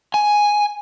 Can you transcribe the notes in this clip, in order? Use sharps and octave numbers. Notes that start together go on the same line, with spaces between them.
G#5